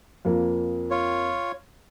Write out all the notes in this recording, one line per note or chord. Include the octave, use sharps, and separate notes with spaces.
F2 A#3
F4 C#5